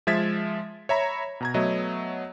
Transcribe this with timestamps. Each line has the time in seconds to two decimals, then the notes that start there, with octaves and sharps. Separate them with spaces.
0.07 F3 G#3 E5 G#6 A6 B6
0.89 C#5 E5 A#5 B5
1.41 B2 A#5 G#6
1.54 F#3 A3 B3 D#5 E5